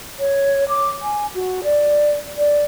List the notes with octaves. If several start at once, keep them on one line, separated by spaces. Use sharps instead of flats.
C#5
D6
G#5
F#4
D5
D5